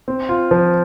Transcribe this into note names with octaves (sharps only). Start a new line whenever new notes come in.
C4
F4
F3